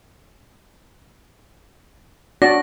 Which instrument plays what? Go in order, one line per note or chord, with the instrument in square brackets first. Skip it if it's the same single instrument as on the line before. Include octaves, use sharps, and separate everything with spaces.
[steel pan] D4 F#4 D5 [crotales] A#6